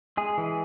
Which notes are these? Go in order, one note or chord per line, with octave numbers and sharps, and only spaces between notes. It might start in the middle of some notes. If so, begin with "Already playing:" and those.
G#3 G#4
E3